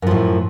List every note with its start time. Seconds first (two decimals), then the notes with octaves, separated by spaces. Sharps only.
0.02 F#2
0.07 F3
0.11 A2